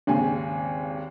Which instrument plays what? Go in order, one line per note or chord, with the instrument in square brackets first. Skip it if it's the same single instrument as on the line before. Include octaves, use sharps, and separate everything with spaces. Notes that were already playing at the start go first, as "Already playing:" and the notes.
[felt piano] G#1 D#2 C#3 G#5